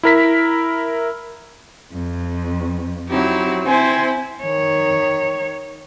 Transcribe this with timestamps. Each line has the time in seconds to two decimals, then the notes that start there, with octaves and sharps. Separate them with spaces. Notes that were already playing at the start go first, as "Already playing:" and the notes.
0.03 E4 A#4 B6
1.92 F2
3.09 F#3 C4 D#4 E4 G4
3.67 C4 E4 C5 G#5
4.41 D#3 C#5